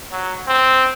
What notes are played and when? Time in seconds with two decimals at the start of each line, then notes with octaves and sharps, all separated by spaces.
0.11 F#3
0.47 C4